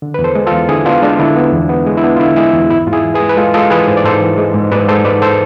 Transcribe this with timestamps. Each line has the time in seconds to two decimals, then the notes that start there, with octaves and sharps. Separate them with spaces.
0.02 D3
0.14 E2 B4
0.24 A4 C5
0.35 G#3
0.47 F4 A4
0.52 E2
0.69 D3 E4 G#4
0.85 B3 D4 F4
1.02 G#3 D4
1.19 D3 E4
1.36 B3
1.53 E2
1.69 B3
1.87 G#3
1.97 E4
2.03 B3 D4
2.16 F4
2.20 D3 E4
2.36 G#3 E4 G#4
2.53 E2
2.70 G#2 E4
2.87 G#2 F4
2.92 E4 G#4
3.04 E3
3.14 G#4 B4
3.20 G#3
3.29 B4
3.37 G#3 F4 A4
3.54 G#3 F4 A4
3.70 E3 G#4 B4
3.87 G#2 C5
3.97 D5
4.04 G#2 A4 C5
4.21 E3
4.38 G#3
4.54 G#2
4.71 G#2 B4 D5
4.88 G#3 A4 C5
5.05 G#2 B4 D5
5.22 A4 C5